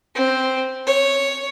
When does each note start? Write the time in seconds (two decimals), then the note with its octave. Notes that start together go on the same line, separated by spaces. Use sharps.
0.15 C4
0.87 C#5